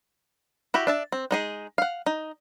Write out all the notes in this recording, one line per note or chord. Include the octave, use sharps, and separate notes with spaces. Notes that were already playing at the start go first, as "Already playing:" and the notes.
E4 F#4 G4 E5
D4 E5 A5
C4
G#3 D#4 G#4
F5 F#5
D#4